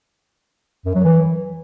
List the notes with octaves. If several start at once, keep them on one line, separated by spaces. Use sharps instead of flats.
F#2
F#3
E3